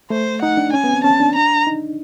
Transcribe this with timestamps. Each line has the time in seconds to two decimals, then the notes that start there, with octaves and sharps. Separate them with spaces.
0.10 A3 C5
0.42 D#4 F#5
0.57 D4
0.73 C#4 G#5
0.84 B3
0.93 C4
1.04 C#4 A5
1.20 D4
1.35 A#5
1.67 D#4